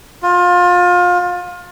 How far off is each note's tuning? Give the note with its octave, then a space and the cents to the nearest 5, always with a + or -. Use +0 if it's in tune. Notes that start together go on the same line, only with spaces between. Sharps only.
F4 +25